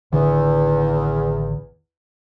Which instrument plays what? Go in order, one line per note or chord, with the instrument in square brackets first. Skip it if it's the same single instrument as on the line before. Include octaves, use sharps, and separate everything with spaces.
[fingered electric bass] A1 D3 D#3 [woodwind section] E2